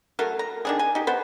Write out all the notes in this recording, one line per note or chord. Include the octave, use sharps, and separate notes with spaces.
F#3 A3 A#4
A#5
D#3 D4 G#4
G#5
D#4 G4
B3 C5